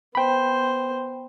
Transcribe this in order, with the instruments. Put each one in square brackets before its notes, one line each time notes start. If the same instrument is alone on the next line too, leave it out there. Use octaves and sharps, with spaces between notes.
[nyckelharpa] B3 C5 [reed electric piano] G5 B5